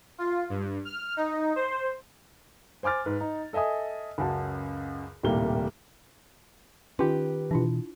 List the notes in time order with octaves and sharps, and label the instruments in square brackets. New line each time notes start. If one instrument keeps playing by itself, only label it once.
[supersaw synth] F4
G2
F6
D#4
C5
[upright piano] C5 G#5 D6 F6 A6
G#2 B4
D#4
A4 D#5 E5 G#5 D#6
C#2 F#2 F#4 A5
D#1 C2 A2 G3 A#3 G7
[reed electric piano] D#3 G4 B4 [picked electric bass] C#4 [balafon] F4
[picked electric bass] B2 E3 [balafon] D4 E4 F4